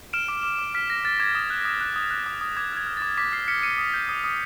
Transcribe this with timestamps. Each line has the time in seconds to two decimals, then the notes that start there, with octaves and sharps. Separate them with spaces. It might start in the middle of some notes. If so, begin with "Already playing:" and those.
0.13 F6 D7 E7
0.28 D6
0.43 D6
0.59 D6
0.74 F6 B6
0.89 F6 A#6
1.05 F6 A6
1.20 D6 G#6
1.35 D#6
1.50 F#6
1.65 D#6
1.81 F#6
1.96 D#6
2.11 F#6
2.26 D#6
2.41 D#6
2.57 D6 G#6
2.72 F6 G#6
2.87 F6
2.97 D6 A6
3.18 D6 B6
3.32 F6 C7
3.48 F6 B6 C#7
3.62 F6 C#7 D#7
3.78 D#6
3.94 G6
4.09 D#6
4.24 D#6